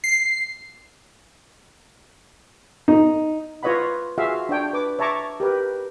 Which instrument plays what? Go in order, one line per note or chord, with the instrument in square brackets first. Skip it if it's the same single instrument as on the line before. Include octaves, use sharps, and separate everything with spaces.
[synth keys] C7
[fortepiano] D#4
[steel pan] F4 B4 C#5 D#5 F#5 B5
F4 F#4 G#4 E5 F5
D4 C#5 G5
B4 D6
C#5 E5 A5 A#5 C#6 D6
G4 A#4 B4